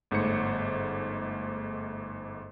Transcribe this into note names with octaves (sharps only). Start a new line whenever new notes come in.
G1 G#2 A3 C5 C#7